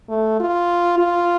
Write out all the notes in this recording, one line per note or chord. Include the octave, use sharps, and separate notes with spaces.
A3
F4
F4